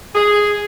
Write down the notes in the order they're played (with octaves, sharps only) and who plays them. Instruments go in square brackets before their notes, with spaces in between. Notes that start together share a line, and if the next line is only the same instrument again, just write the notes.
[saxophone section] G#4